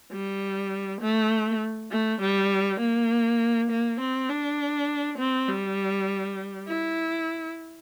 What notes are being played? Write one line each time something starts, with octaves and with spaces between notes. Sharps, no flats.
G3
A3
A3
G3
A#3
A#3
C4
D4
C4
G3
E4